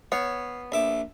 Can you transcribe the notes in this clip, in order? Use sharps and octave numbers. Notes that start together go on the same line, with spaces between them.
B3 C#5 F5
A#1 E5 D6